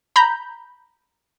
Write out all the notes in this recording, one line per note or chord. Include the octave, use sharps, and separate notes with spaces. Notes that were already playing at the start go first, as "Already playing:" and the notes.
A#5 B5 G6